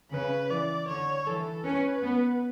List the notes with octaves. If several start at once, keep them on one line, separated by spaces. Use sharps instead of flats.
C#3 B4
E3 D5
D3 C#5
E3 A4
C#4 B4
B3